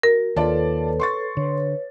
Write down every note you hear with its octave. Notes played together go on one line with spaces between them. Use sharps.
F#4 A#4
D#2 F4 A4 B4 C#5 D5 A5
C6 C#6 A6
D3 B4 C#5